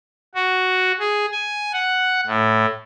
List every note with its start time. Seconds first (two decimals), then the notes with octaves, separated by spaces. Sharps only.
0.35 F#4
0.99 G#4
1.32 G#5
1.73 F#5
2.27 A2